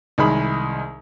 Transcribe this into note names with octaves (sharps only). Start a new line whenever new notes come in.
C2 D#3 G#3 B5